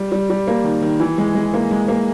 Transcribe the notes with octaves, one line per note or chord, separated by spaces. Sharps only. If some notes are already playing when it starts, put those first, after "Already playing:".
Already playing: G3
G3
G3
A#3
D#3
D#3
E3
G#3
G#3
A#3
G#3
A#3